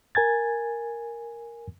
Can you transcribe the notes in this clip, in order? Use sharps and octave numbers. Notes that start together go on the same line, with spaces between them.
A#4 G#5 G#6 A6